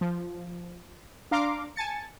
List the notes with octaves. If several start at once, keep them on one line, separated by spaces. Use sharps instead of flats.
F3
D4 F5 A#5 C6 D6
G#5 A5 A6 C#7